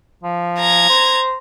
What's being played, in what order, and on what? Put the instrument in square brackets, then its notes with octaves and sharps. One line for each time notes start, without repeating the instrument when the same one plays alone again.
[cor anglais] F3
[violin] A#5 G#6
[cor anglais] C5